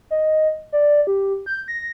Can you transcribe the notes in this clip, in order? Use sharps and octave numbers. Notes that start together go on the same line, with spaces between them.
D#5
D5
G4
G6
A#6